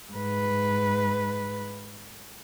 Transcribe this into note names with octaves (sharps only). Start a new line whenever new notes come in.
G#2 B4